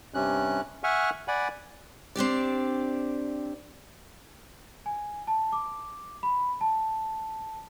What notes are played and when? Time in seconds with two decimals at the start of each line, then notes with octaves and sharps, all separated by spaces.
0.14 G2 C3 C#4 F#6
0.84 E5 F#5 G#5 C#6 F6
1.28 D5 F#5 G#5 B5
2.16 C4 D4 G4 D5
4.86 G#5
5.27 A5
5.53 D6
6.23 B5
6.61 A5